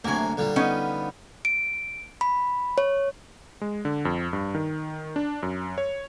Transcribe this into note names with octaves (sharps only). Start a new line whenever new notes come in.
D2 C3 F#3 A#3 G#5
D3 F3 G3
B3 C#4 D#4
D7
B5
C#5
G#3
D3
F2
G2
D#3
D4
F#2
C#5